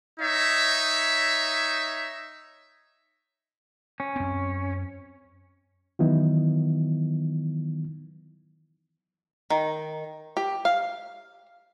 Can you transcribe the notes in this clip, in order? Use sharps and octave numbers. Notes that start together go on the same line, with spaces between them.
D#4 C#5 E5
C#4
F#2 C4
D#3 E3 F#3 B3 D#4 E4
D#3
G4
F5